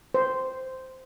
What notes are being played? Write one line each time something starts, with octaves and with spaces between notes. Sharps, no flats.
C5